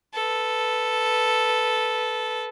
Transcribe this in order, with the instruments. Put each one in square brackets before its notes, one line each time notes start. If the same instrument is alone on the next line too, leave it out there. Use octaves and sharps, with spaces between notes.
[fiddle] A4 B4